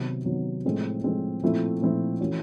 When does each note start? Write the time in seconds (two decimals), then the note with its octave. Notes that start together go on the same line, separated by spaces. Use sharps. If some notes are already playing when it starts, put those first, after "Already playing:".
Already playing: C3 D#3 F#3 B3
0.25 C3 D#3 F#3 B3
0.64 A2 F3 G#3 C4
1.04 A2 F3 G#3 C4
1.43 A#2 F3 A3 C4 E4
1.81 A#2 F3 A3 C4 E4
2.20 E3 A3 C#4 F#4